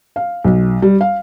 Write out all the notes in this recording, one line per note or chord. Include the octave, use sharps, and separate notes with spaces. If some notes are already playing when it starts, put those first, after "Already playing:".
F5
B1
G3
F5